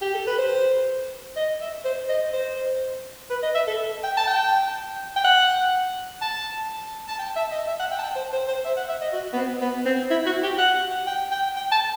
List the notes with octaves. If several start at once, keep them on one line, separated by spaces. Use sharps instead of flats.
G4
A4
B4
C5
D#5
E5
C5
D#5
C5
B4
D#5
E5
A4
G5
A5
G5
G5
F#5
A5
A5
G5
E5
D#5
E5
F#5
G5
A5
G5
C5
C5
C5
E5
F#5
E5
D#5
F#4
B3
C4
B3
C4
E4
F#4
G4
F#5
G5
G5
G5
A5